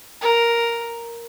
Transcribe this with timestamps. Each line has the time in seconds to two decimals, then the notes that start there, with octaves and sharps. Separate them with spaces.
0.21 A#4